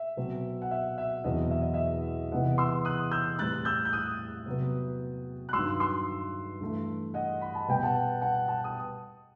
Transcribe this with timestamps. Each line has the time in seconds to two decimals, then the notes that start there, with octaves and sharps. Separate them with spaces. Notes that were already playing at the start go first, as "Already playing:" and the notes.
Already playing: E5
0.17 B2 F#3 C4
0.62 F#5
0.71 E5
0.98 E5
1.24 E2 B2 F#3 C4 D#5
1.51 E5
1.62 D#5
1.74 E5
2.32 C3 E3 B3 D#5 F#5
2.58 C6 E6
2.85 D#6 F#6
3.12 E6 G6
3.39 A2 G3 C4 F#6 A6
3.65 E6 G6
3.85 G6
3.93 D#6 F#6
4.46 C3 F#3 B3
5.49 F#6
5.53 G2 D#3 F#3 C6 E6
5.80 C6 E6
6.61 G2 E3 A3
7.14 D#5 F#5
7.42 B5
7.55 A5
7.68 B2 G3 B3 G5
7.83 F#5 A5
8.21 F#5 A5
8.48 F#5 A5
8.64 D#6